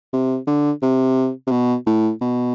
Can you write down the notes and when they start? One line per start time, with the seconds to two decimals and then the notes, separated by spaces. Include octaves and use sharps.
0.13 C3
0.47 D3
0.82 C3
1.47 C3
1.51 B2
1.86 A2
2.21 B2